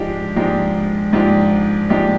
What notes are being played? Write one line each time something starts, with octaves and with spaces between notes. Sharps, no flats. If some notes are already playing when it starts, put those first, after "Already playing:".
Already playing: G#2 F3 G#3 D4 G4
G#2 F3 G#3 D4 G4
G#2 F3 G#3 D4 G4
G#2 F3 G#3 D4 G4